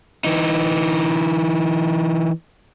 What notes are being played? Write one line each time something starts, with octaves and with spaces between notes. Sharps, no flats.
E3 D#4